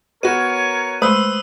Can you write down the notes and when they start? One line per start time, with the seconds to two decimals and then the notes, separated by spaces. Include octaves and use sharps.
0.23 B3 F#4 A#4 C#5 D#7
1.02 G#3 A3 B4 C5 D#6 E6